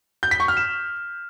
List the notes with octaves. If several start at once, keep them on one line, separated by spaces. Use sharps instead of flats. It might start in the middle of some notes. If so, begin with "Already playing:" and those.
G6
B6
C#6
F6
E7